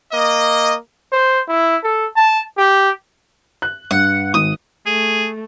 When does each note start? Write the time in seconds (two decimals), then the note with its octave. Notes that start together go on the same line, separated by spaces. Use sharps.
0.12 A#3 D#5
1.12 C5
1.48 E4
1.84 A4
2.16 A5
2.58 G4
3.62 F#6
3.91 G2 F#5
4.34 G#1 D#6
4.86 A3 G#4